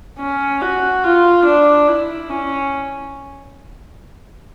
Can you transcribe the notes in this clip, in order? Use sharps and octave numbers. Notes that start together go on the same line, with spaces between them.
C#4
F#4
F4
D4
E4
C#4